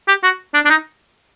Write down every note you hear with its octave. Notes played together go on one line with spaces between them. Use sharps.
G4
F#4
D4
D4
D#4